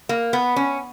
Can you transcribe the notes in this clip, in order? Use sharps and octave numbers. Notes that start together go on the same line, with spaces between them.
A#3
B3
C#4